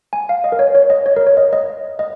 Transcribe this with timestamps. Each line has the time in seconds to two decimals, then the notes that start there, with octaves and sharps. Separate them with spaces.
0.13 G#5
0.29 F5
0.44 D#5
0.52 A#4
0.59 C#5
0.75 C#5
0.90 D#5
1.06 C#5
1.16 A#4
1.27 C#5
1.37 D#5
1.53 D#5
1.99 D#5